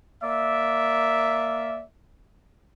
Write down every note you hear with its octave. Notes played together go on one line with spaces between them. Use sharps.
A#3 D5 E5